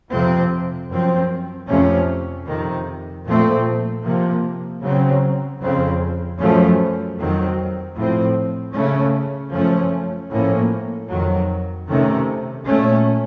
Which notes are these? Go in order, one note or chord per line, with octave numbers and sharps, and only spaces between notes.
F2 C3 F3 C4
F#2 F3 C4
F2 C3 F3 A3 C#4
F2 C3 D#3
A#2 F3 A3 C4
C3 F3 A#3
C#3 F#3 C4
F2 C#3 F3 C4
F#2 F3 A3 C#4
F2 D#3 F#3 C4
A2 F3 C4
C#3 A3 C#4
F#2 F3 A3 C#4
A2 F3 A#3 C#4
F2 D#3 F#3
C3 D#3 A3 C#4
A#2 A3 C#4